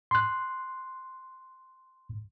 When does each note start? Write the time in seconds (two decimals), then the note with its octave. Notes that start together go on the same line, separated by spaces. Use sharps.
0.11 C6 F#6